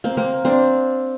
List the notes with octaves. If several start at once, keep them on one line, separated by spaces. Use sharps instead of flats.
A#3 C4
A#3 C4
C4 D4